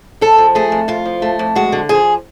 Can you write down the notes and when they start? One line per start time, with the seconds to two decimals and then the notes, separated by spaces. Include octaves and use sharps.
0.21 F2 A4
0.38 F3
0.55 A3 G#4
0.72 F2
0.88 F2 F4
1.06 F3
1.22 A3
1.39 F2
1.55 G#3 F#4
1.72 D3
1.89 F3 G#4